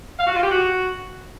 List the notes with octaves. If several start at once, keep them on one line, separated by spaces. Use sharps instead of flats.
F5
F#4
F4
G4
F#4